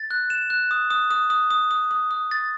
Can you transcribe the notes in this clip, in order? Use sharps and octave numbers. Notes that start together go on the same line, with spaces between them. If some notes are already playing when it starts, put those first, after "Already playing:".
Already playing: A6
F#6
E7
F#6
D#6
D#6
D#6
D#6
D#6
D#6
D#6
D#6
A6